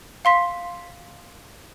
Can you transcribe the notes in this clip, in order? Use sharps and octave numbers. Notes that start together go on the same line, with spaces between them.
F5 C6 B6